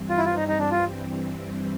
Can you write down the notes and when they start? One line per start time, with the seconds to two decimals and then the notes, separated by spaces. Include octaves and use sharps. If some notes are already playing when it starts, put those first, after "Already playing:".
Already playing: G2 E3 G3 C4
0.09 F4
0.18 E4
0.25 F4
0.36 D#4
0.48 D#4
0.59 D4
0.71 F4